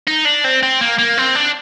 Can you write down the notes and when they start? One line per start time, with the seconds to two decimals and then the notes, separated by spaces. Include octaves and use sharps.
0.08 D#4
0.25 D4
0.44 C4
0.63 C4
0.81 A#3
0.99 A#3
1.18 C4
1.35 D4